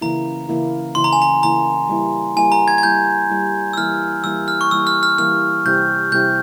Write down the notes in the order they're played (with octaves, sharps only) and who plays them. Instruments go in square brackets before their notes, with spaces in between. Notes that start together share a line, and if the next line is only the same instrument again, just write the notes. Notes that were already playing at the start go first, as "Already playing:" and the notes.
[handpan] C#3 E3 A#3 E4 [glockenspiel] A#5
[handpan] C#3 E3 A#3 E4
[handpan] C#3 E3 A#3 E4 [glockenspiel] C6
[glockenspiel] A#5
G#5
A#5
[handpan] C#3 E3 A#3 E4 [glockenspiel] A#5
[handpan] G3 A#3 E4
[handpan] G3 A#3 E4 [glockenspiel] G#5
[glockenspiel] A#5
G#6
G#6
[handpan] G3 A#3 E4 [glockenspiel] G6
[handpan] G3 A#3 E4
[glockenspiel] E6
[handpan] E3 G3 A#3 E4 [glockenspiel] F6
[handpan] E3 G3 A#3 E4 [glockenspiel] E6
[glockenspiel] F6
C#6
[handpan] E3 G3 A#3 E4 [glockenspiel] E6
[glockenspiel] F6
F6
[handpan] E3 G3 A#3 E4 [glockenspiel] F6
[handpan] C3 G3 C4 E4 G4 [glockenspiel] G6
[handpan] C3 G3 C4 E4 G4 [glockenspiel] G6